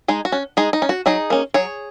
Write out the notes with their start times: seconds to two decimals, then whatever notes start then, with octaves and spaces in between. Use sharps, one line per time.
0.08 G#3 D#4 G#4
0.25 F#4
0.32 C#4
0.57 G#3 D#4 G#4
0.73 D#4
0.82 C#4
0.89 F#4
1.06 F#3 D#4 G#4
1.30 A#3 C#4
1.54 F#3 G#4 C#5